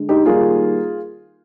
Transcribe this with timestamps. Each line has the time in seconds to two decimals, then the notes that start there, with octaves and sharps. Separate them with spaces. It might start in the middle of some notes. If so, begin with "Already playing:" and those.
Already playing: D3 G#3
0.09 D#4 G4
0.26 D#3 G3 A#3 F4 G#4